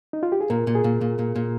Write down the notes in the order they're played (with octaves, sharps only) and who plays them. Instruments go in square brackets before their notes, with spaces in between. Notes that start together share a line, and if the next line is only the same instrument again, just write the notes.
[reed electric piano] D#4
F4
G4
G#4
[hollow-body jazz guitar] A#2 [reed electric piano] A#4
[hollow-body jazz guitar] A#2
[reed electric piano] G#4
[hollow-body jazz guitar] A#2
A#2
A#2
A#2